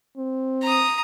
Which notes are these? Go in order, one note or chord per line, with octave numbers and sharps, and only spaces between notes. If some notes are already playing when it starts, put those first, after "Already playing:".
C4
A#5 D#6